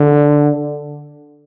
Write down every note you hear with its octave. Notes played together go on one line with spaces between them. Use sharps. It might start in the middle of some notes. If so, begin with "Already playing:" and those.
Already playing: D3